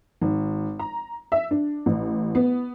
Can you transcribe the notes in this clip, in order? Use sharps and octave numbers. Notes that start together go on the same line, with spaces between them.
G#1
A#5
E5
D4
A1
B3